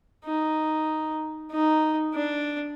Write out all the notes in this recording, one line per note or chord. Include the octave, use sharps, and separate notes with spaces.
D#4
D#4
D4